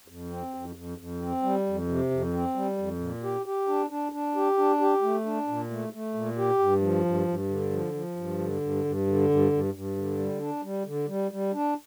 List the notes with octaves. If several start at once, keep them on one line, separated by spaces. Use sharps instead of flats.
F2
C4
F2
F2
F2
C4
G3
F2
C3
F2
C4
G3
F2
A#2
G4
G4
D4
D4
D4
G4
D4
G4
A3
D4
A#2
A3
A3
A#2
G4
G2
F3
G2
G2
D3
F3
F3
G2
D3
G2
G2
D3
G2
G2
G2
D3
G3
D4
G3
D3
G3
G3
D4